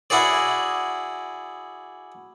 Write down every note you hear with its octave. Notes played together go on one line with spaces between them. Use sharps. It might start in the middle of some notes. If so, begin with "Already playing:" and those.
E4 F#4 G#4 D5